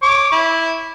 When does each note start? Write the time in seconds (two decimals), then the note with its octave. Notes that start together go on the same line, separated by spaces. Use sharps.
0.03 C#5 D6
0.32 E4